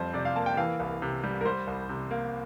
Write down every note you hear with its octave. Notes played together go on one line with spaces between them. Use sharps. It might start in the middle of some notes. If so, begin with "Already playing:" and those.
Already playing: F2 G3 C4 C5
C3 D5
F5
A#3 A5
G5
E3 F5
C2
C3
G3
A#4
G3 C5
C2
C3
A#3